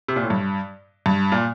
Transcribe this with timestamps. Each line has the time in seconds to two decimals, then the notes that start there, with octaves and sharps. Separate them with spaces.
0.08 C3
0.16 A#2
0.23 A2
0.30 G2
1.06 G2
1.32 A#2